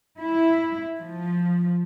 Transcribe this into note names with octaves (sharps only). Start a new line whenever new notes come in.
E4
F3